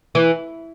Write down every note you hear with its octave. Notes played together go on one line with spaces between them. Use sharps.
E3